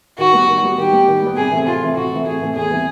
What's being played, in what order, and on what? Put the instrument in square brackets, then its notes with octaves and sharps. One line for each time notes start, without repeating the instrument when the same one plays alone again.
[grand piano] D#3 [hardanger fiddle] F#4
[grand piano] G3 B3
D#3
G3 B3
[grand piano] D#3 [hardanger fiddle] G4
[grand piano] G3 B3
D#3
G3 B3
[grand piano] C3 [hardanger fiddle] G#4
[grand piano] E3 A3 C4
[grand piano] C3 [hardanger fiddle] F4
[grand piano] E3 A3 C4
[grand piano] C3 [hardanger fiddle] F#4
[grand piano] E3 A3 C4
[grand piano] C3 [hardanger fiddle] G#4
[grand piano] E3 A3 C4
[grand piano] E2 [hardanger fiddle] G#4
[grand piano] C3 E3 G3 B3